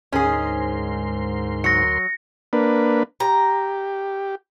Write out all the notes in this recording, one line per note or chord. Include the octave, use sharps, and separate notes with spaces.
D2 G#2 C#4 G#4 A#4 C6
F#3 A#6 C#7
A#3 D4 B4
G4 A#5